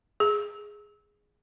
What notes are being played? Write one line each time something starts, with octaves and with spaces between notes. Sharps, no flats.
G#4